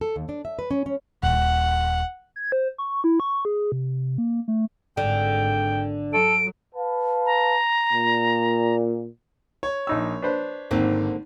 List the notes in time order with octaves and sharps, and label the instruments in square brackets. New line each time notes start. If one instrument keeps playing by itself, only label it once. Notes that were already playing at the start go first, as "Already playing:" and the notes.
[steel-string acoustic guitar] A4
D#2
D4
E5
B4
C#4
C#4
[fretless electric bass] D#1 [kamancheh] F#5
[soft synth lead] G#6
C5
C#6
E4
C#6
G#4
C3
A#3
A3
[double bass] G#1 G#2 [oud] D3 [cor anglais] G5
[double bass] F#3 [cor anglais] A4 [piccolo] D7
[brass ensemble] B4 F5 A5
[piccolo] A#5
[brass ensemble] A#2
[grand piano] C#5
[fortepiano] A#1 D#4 E6
D4 B4 C5
[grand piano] G#1 [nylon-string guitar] D3 A#3 C4